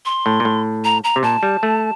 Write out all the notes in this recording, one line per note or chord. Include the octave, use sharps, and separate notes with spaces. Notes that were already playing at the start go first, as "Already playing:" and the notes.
C6
A2
A#2
A2
A#5
A#5
C3
A#2 A5
G3
A3